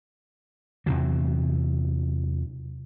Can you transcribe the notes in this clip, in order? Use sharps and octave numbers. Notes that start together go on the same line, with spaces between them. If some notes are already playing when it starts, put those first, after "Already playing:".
E2 C3 E3 F#3